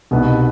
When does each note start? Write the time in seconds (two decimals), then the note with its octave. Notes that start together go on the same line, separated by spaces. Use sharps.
0.11 C2 B2 B3 D#4